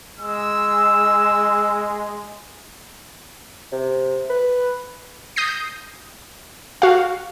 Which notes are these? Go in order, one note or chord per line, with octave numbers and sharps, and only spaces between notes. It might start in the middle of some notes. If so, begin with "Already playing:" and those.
G#3 E6
C3
B4
D#6 G6 A#6 C7
F#4 F5